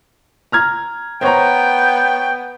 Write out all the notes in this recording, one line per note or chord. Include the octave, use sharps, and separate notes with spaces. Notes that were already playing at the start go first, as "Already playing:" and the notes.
A#5 F6 G#6
B3 C5 C#5 G5 A#5